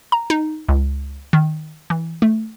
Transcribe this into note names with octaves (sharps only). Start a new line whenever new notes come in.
A#5
D#4
C#2
D#3
E3
A3